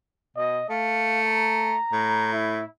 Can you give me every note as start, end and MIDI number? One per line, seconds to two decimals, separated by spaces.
0.37 0.60 47
0.37 0.67 75
0.70 1.75 57
0.70 1.20 77
1.27 2.32 82
1.92 2.61 45
2.33 2.65 64